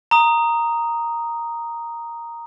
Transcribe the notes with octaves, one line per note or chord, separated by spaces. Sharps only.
A#5 D#6